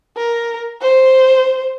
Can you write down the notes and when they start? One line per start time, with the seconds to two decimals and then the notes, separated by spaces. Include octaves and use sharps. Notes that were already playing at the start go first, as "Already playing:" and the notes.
0.17 A#4
0.82 C5